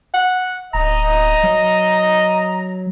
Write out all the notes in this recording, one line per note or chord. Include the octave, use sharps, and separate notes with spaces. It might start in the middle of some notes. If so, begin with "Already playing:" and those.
F#5
D1 D#5 A#5
F#3